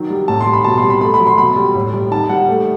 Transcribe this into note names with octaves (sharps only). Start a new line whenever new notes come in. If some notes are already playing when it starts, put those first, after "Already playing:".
Already playing: D#3 F#3
G3
A2 A5
C6
G3
B5
B2 A5
C6
G3
B5
A3 B5
B5
F#3
C6
B2 B5
G3
A2
G3
D#3 A5
G3 F#5
A3